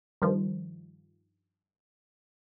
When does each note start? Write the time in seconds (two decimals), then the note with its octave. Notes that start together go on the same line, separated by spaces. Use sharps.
0.22 G2 D#3 F3